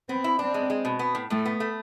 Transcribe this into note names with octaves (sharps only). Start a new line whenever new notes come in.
B3 C4
E4
C4 D4
G#3
G#3
B2
B3
A2
A2 A3
B3
A3